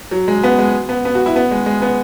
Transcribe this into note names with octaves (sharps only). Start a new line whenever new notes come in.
F#3
G#3
B3
G#3
B3
B3
F#4
E4
B3
G#3
G#3
B3